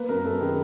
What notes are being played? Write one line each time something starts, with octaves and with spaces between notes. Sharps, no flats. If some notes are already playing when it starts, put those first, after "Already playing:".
Already playing: A#3 B4
F#2 A#4
F#2 A4
D#3 G#4